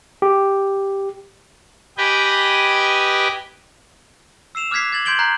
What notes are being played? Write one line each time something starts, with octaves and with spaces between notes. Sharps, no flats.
G4
G4 B4 D#5 G5 G#5
E6 C7 E7 F7
D6 F6 F#6 G#6 B6 C7
D6 G#6 A6 F#7
C6 G6 G#6 D7 F#7 G7
A#5 F#6 G6 C7